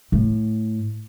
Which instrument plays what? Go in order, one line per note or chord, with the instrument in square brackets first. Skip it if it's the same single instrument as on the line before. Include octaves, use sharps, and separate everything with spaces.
[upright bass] A2